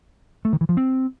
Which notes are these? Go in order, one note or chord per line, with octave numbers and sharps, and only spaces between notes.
A3
D#3
E3
F3
C4